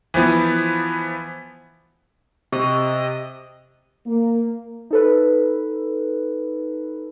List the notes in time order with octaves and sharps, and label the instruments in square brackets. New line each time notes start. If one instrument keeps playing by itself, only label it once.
[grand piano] E3 F3 B3
[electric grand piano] C3 [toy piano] G4 [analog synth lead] D#5
[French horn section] A#3
[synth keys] D#4 A4 B4